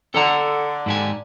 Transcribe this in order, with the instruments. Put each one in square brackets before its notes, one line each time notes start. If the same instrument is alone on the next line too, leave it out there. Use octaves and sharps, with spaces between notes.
[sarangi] D3 [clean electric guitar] A4 F#5 A#5
[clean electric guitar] G#2 G4 G#5